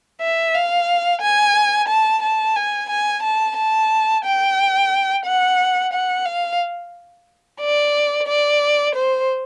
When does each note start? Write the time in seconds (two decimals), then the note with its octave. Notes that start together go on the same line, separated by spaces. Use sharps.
0.22 E5
0.55 F5
1.21 G#5
1.89 A5
2.23 A5
2.56 G#5
2.90 G#5
3.23 A5
3.57 A5
4.25 G5
5.26 F#5
5.93 F#5
6.26 F5
7.61 D5
8.27 D5
8.95 C5